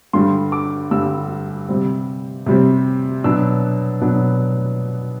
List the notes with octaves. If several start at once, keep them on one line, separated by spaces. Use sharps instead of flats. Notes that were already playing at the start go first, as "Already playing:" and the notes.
G2 D3 G3 C6
D6
G2 D3 G3 E6
C3 G3 C4
C3 G3 C4
B2 F#3 B3 D4 E6
B2 F#3 B3 D4